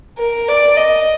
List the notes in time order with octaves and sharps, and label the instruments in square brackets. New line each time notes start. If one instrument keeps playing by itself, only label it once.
[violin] A#4
D5
D#5